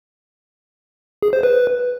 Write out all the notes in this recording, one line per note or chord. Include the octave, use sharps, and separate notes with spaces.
G#4
C5
B4